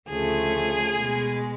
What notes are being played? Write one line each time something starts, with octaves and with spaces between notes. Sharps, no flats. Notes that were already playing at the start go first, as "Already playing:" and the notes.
D2 C#3 F3 A3 G#4
B2 G#3